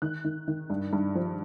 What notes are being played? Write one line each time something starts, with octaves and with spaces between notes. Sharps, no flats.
D#3 F#6
D#3
D#3
G2
G2
F3